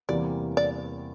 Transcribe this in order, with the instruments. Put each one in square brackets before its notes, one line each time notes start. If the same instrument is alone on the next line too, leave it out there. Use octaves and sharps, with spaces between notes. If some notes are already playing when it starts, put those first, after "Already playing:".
[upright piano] E2 C3 E3 G3 A#3 [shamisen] D5
[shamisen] D5